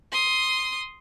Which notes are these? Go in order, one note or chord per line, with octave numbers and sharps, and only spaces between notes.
C6 D#6